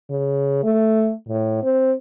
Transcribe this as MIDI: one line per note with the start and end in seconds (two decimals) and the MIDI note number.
0.10 0.61 49
0.64 1.13 57
1.28 1.62 45
1.63 1.92 60